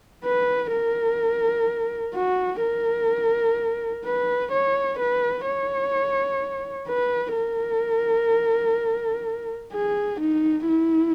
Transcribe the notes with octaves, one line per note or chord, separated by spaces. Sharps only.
B4
A#4
F#4
A#4
B4
C#5
B4
C#5
B4
A#4
G#4
D#4
E4